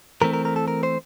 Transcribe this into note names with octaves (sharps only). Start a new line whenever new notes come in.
E3 A3 C4 A#4
A#4
A#4
A4
A#4
C5